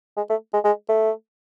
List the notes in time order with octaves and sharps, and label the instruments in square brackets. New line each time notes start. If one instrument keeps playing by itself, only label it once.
[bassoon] G#3
A3
G#3
G#3
A3